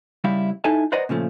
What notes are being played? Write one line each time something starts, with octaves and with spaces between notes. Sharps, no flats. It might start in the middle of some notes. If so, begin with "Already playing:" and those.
C#3 G3 E4 E5 F5
D#4 E4 A4 E5 G#5 A5
B4 C5 D5 D#5 F#5 A#5
A#2 C#3 F3 A3